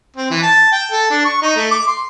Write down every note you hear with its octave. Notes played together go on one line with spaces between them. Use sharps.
C4
E3
A5
G5
A4
D4
C#6
D#4
A3
D6
C6